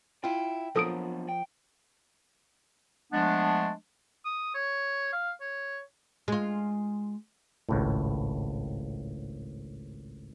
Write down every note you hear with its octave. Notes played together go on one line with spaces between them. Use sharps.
E4 F4 G5
F3 F#3 B3 D4 A4 A#4 D#6 D7
G5
F3 G#3 A3 B3 D4
D#6
C#5
F5
C#5
G#3 F4
G#1 C#2 A2